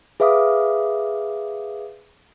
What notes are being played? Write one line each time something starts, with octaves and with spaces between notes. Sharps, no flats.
G#4 B4 E5 F5 D6 D#6